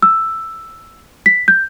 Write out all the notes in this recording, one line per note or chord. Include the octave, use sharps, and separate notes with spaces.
E6
B6
G6